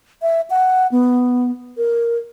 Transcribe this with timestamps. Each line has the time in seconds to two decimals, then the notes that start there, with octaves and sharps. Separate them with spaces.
0.22 E5
0.50 F#5
0.92 B3
1.77 A#4